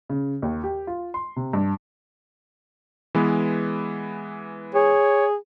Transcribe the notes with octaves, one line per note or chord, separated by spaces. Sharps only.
C#3
D#2
G4
F4
C6
C3
G2
E3 G#3 B3
G#4 C#5